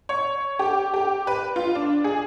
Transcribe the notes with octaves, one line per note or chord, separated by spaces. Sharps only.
C#5
G4
G4
B4
F4
D4
G#4